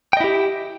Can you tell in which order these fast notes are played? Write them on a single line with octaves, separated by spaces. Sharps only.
G5 D#5 E4 G4